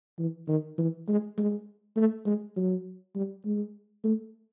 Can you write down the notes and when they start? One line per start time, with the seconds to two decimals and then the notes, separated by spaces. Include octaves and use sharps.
0.19 E3
0.48 D#3
0.78 E3
1.08 G#3
1.38 G#3
1.96 A3
2.26 G#3
2.56 F#3
3.15 G3
3.45 G#3
4.04 A3